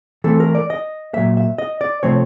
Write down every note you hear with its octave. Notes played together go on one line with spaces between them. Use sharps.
E3 A3 C4 A4
A#4
D5
D#5
A#2 F#3 A#3 E5
E5
D#5
D5
C3 F3 A3 C4 C#5